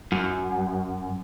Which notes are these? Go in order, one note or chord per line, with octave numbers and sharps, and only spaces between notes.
F#2